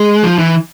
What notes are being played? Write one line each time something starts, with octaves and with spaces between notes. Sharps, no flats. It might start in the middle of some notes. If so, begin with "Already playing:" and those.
Already playing: G#3
F3
E3